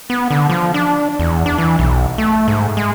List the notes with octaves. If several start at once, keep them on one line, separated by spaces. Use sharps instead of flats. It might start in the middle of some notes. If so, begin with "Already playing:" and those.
B3
D3
F3
D4
E2
D4
E3
B1
A3
G#2
G#3